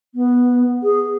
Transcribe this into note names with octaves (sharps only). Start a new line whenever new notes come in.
B3
G#4